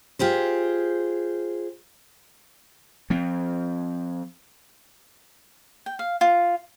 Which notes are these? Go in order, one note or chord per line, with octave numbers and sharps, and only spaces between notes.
F4 G4 G#4 C5
F3 C4
G5
F5
F4